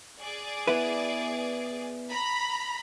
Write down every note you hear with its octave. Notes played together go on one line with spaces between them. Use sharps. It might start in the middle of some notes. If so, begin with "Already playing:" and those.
G#4 D5
B3 E4 B4
A#5 B5